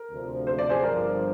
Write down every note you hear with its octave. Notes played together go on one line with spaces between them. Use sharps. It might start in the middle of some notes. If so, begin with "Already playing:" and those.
Already playing: A#4
D2 C3 F3
C5
D5
G#4 C5
G1 G2 F3 A#4 D5